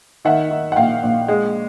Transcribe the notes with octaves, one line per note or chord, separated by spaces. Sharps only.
D#3 E5 F#5
D#3
F#5
A#1 F5 G5
A#1
G#3